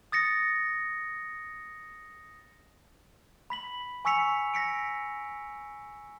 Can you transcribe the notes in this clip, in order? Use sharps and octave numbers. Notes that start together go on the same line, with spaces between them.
D#6 A6 A#6 C#7
B5 B6 F#7
G#5 C#6 E6 B6 C#7 F7
A#6 B6 C#7 D7